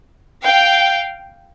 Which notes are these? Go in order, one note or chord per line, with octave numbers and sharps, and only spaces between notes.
F5 G5